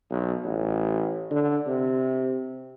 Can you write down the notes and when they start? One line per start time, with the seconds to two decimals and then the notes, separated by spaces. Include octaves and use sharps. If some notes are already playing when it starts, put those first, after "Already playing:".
0.11 B1
0.44 A1
1.31 D3
1.67 C3